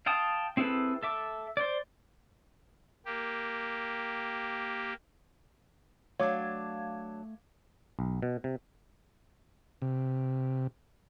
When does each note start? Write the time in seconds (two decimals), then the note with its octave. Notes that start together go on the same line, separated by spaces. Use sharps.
0.06 F5 G5 A5 D#6
0.57 C4 E4 G#4 A4 B4
1.03 A4 E5 D6
1.57 C5 D5
3.05 A#3 G4
6.20 F#3 A3 D4 C#5 F5 D6 G#6
7.99 B1
8.22 B2
8.44 C3
9.82 C3